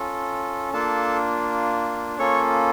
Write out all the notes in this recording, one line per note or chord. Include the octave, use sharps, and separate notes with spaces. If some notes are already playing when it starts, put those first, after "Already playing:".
Already playing: C#4 F4 A4
A#3 D4 F4 A4 A5
A#3 C#4 F4 A4 C#5 C#6